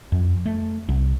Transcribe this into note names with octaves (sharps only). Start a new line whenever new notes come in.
F2
A3
C2